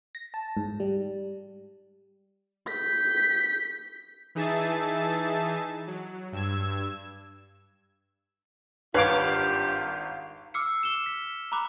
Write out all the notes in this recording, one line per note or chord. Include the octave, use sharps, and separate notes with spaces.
A#6
A5
G#2
G3
G6 B6
E3 D#4 G#4 E5 A5 A6
F#3
G2 E6 G#6
G#1 G2 F4 G4 B4 C#5 F5 D6
D6 E6 F6 C7 C#7
E7 G7
B6
A#5 B5 D6 F#6